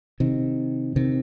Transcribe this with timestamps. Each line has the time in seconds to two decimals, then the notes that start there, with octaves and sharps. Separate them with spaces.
0.20 C3 D#3
0.96 C3 D#3